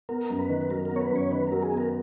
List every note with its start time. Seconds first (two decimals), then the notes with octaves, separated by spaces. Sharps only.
0.09 B3 A#4
0.30 F#2
0.39 B4
0.49 D#3
0.70 F#3 A#4
0.85 B3 A#4
0.96 C#5
1.01 B4
1.10 F#2
1.16 C#5
1.31 D#3 B4
1.47 F#3 A#4
1.62 G#4
1.72 B3
1.77 A#4